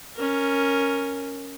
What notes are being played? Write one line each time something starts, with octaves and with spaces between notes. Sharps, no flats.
C#4 A#4